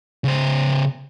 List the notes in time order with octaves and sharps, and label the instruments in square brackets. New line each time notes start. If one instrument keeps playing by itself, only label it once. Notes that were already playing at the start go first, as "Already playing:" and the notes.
[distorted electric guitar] C#3 C5